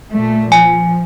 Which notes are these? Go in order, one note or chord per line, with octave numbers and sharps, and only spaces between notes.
A#2 A3
F3 G#5